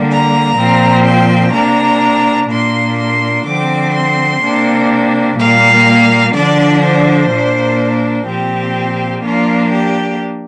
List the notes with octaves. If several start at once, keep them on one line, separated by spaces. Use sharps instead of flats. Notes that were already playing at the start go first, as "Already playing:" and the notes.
Already playing: D3 G3 A#3
A#5
A#2 F3 C4
G5
C3 A#3 D4 A#5
A#2 A#3 D4 C6
C6
D3 F3 C4 D6
C6
C3 A#3 D4
A#2 G3 A#3 F5
D3 F3 D4 D5
C5
A#2 A#3 D4
A#2 F3 C4 G4
F3 A#3 D4 F4
G4